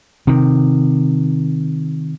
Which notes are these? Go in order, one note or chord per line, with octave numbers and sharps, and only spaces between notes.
C3 D#3